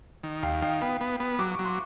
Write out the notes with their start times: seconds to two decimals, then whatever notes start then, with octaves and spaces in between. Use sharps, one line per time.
0.23 D#3
0.43 D#2 F5 G5
0.62 D#3 F5 G5
0.81 B3 F5 G5
1.01 B3
1.20 B3
1.39 F#3 D6
1.52 C#6
1.59 F#3
1.65 C6